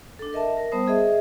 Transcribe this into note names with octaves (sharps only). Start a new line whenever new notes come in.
D4 A4
A#4 D#5 E5 A5
A#4
G3 B3 C5 A5 D#6
G#4 D#5 E5